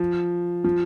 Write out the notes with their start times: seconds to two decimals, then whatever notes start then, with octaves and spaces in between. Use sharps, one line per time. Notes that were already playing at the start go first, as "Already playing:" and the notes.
Already playing: F3
0.64 F3